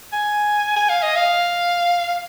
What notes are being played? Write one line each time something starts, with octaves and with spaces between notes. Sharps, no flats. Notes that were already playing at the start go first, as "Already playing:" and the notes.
G#5
G#5
F5
D#5
F5